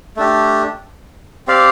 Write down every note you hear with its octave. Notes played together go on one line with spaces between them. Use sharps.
A3 D4 G4
C4 G4 D5 F5